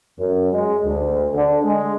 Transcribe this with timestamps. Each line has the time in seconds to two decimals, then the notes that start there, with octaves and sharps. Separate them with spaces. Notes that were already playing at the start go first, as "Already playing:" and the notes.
0.19 F#2
0.53 G#3
0.84 D2
1.34 D3
1.64 G#3